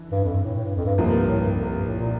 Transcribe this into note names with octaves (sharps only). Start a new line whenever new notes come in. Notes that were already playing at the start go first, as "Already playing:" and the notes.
Already playing: E3 D4
G2
F2
G2
A2
A2
G2
F2
G2
C2 C3 F3 A#3
F2
G2
A2
G2
G2
F2
G2
A2
A#2